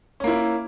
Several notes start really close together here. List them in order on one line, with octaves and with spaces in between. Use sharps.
C#4 A#3 E4